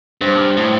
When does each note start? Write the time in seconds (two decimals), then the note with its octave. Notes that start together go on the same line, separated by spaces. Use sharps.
0.21 G2 C5
0.57 A2